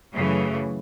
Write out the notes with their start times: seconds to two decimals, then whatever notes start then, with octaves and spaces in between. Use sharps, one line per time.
0.13 F#2 C#3 E3 A3